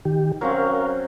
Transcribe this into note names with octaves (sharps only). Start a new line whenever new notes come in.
D#3 G4
F#3 C4 C#4 A#4 F5